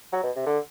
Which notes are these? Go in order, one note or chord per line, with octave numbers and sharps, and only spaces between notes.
F#3
B2
C3
D3